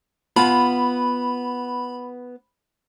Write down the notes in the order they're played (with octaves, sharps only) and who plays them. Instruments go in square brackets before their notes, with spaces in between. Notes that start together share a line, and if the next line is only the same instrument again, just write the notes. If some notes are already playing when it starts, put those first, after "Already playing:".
[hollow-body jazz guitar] B3 F4 A5 [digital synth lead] B5